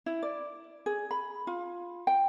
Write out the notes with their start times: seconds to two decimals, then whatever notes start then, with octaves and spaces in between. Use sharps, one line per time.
0.06 E4
0.23 D5
0.86 G#4
1.11 B5
1.47 F4
2.07 G5